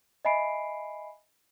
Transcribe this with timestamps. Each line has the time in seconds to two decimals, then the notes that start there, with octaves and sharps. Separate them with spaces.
0.25 D#5 E5 G#5 B5 C7 D7